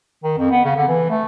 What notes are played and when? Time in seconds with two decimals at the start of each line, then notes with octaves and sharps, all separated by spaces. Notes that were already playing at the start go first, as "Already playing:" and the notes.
0.24 D#3
0.38 F2
0.51 B3
0.65 C#3
0.76 D3
0.88 E3
1.10 A3